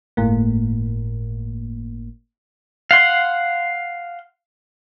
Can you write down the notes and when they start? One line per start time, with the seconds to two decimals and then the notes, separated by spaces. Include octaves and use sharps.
0.17 G1 A2 A#3
2.91 F5 F#5 C6